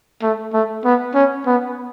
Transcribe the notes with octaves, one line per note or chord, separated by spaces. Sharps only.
A3
A3
B3
C#4
B3